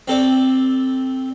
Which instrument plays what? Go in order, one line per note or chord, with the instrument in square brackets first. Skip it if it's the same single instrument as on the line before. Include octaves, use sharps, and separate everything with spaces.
[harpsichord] C4 A4 D5